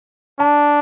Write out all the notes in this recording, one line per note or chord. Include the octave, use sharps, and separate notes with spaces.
D4 A5